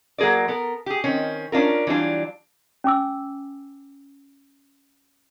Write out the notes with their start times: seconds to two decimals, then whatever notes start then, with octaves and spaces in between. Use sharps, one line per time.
0.18 F#3 A#3 G#4 A#4 D5
0.48 B3 A4 A#4
0.86 G4 G#4
1.04 D#3 C4 C#4
1.52 C#4 D4 F4 A#4
1.87 E3 F#3 G3 D4 F4
2.84 C#4 G#5 D6 E6